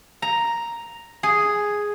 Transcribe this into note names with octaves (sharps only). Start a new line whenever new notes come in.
A#5
G#4